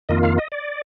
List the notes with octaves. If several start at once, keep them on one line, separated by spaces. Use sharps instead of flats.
F2 D#3 A#3 F4 D#5
F5
D#5
D5